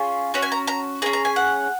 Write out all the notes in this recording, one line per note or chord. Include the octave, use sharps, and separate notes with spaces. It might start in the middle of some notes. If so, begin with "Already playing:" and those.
Already playing: C#4 F4 G#4
C#4 F#4 C#5
G#5
A#5
A#5
C#4 G#4 A#5
A#5
G#5
F#5